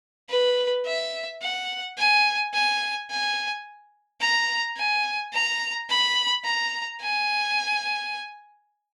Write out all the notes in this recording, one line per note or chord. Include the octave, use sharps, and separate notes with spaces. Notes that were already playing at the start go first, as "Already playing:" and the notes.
B4
E5
F#5
G#5
G#5
G#5
A#5
G#5
A#5
B5
A#5
G#5